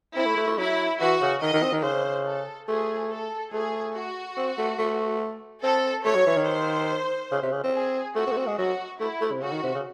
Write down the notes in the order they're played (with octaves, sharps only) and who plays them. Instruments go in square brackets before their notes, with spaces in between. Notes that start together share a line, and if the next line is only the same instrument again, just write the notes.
[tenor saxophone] C4 [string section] E4
[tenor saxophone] A3
A3
A3
[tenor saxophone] F#3 [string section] E4
[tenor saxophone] E3 [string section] F#4
[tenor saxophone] C#3
[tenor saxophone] D#3 [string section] D#5
[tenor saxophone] D#3
C4
D#3
[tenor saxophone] C#3 [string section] C5
[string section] A4
[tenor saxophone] A3 [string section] G#4
[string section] A4
[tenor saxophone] A3 [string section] G#4
[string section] F#4
[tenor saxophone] C4
A3
A3
[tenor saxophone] C4 [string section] A4
[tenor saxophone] A3 [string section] C#5
[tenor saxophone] F#3
E3
D#3
[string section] C5
[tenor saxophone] C#3
C3
C#3
C4
[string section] G#4
[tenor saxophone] A3 [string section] F#4
[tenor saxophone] C4
A3
C4
G#3
[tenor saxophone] F#3 [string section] F#4
[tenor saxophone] A3 [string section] E4
[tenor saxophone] A3
C3
[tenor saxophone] C#3 [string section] F#4
[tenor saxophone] D#3
C3
C#3